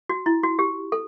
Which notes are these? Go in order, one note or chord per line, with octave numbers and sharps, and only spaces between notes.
F#4
E4
F#4
G4
A4